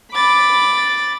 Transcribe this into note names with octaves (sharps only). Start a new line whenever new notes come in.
B5 D6 A6